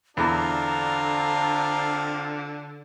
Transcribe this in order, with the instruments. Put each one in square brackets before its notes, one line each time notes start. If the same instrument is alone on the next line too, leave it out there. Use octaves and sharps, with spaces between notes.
[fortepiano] E2 [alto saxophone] D3 [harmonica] C4 D4 F4 [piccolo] A#5